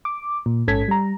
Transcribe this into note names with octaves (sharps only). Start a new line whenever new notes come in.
D6
A#2
A1 G#2 C#4 A4 G#6 B6
G3 A#5